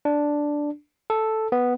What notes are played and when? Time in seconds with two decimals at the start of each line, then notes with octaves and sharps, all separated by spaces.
0.05 D4
1.10 A4
1.52 B3